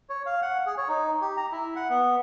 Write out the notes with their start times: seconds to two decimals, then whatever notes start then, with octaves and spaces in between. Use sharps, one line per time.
0.10 C#5
0.26 F5
0.42 F#5
0.66 G#4
0.77 C#5
0.89 D#4
1.21 G4
1.37 A#5
1.52 E4
1.76 F#5
1.90 B3